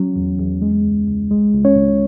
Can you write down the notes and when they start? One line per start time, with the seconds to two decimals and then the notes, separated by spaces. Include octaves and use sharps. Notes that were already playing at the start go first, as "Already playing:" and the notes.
Already playing: F#3 C#4
0.16 E2
0.39 E2
0.62 G#3
0.85 C#2
1.08 C#2
1.31 G#3
1.54 C#2
1.65 C#4 C#5
1.76 C#2